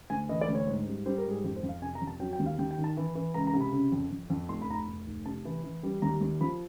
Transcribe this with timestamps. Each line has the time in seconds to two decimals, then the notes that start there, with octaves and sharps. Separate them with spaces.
0.10 D2 G#5
0.29 E3 D#5
0.41 D5
0.48 D2
0.55 C#5
0.67 G#2
0.86 G3
1.06 G3 C5
1.18 A#4
1.25 G#2
1.31 G#4
1.44 F2 G4
1.56 C5
1.63 F2
1.69 F5
1.82 C3 G#5
1.95 A#5
2.01 F2
2.07 A5
2.20 F#3 G5
2.33 G5
2.39 D#2
2.46 F5
2.58 D#2 G5
2.71 G5
2.78 D#3
2.84 A5
2.97 E3
3.15 E3
3.34 C#2 A#5
3.47 A#5
3.53 C3
3.61 B5
3.73 C#3
3.92 F2
4.11 F2
4.30 F2
4.49 F1 C6
4.62 B5
4.69 F1 A#5
4.75 B5
4.88 F1
5.07 F1
5.26 C3 A5
5.45 E3
5.64 E3
5.83 G3
6.02 D#2 A#5
6.21 D#2
6.41 F3 B5